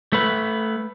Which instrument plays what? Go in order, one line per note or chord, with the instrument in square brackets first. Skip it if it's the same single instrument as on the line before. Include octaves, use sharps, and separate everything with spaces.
[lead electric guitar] A3 B4